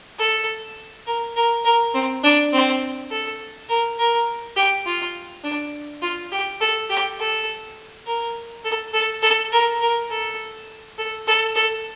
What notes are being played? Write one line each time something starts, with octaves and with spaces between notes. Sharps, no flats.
A4
A#4
A#4
A#4
C4
D4
C4
A4
A#4
A#4
G4
F4
D4
F4
G4
A4
G4
A4
A#4
A4
A4
A4
A#4
A#4
A4
A4
A4
A4